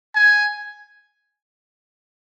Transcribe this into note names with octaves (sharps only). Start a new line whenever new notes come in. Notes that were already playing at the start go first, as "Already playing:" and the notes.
G#5